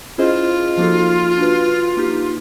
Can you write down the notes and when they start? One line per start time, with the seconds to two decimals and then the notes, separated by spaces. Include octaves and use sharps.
0.18 C#4 E4 F4 G#4 C5 D#5
0.77 F3 A#3 D#4 F#4 A4
1.38 D4 F#4 B4
1.97 A#3 D#4 G4